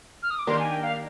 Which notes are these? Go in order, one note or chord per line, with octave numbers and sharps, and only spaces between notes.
F6
D#6
D6
D#3 A#3 D4 G4 A#4 C6
G#5
G5
F5